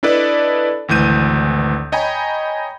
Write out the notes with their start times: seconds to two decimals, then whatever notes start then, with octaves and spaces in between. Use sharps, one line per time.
0.03 D4 E4 A4 B4 D5 D#5
0.88 G#1 D2 E3 G6 D#7
1.92 C#5 D#5 G5 G#5 A#5 B5